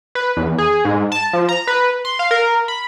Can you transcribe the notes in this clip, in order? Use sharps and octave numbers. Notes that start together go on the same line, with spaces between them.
B4
E2
G#4
G#2
A5
F3
A#5
B4
C6
F5
A#4
B5